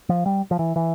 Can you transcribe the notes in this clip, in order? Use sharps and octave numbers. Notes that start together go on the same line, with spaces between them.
F3
G3
F3
E3
E3